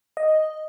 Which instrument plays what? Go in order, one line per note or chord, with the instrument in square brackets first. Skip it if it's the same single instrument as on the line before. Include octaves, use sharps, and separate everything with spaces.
[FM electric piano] D#5